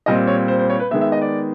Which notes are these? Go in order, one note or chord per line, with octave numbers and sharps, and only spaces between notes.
A#2 G3 C4 D#5
C#5
C5
C5
C#5
B4
D#3 G#3 B3 E5
E5
D#5
D5